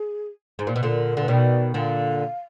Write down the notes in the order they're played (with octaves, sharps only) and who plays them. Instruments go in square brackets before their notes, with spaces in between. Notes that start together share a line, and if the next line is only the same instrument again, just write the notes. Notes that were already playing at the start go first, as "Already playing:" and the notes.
Already playing: [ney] G#4
[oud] G#2
A#2
B2
[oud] A#2 D3 [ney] A#4
[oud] D3 [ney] B4
[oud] B2 D#3 [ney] D5
[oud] A#2 D3 [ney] F5